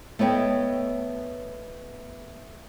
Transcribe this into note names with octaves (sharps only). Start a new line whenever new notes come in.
A3 B3 C#5 D#5 G5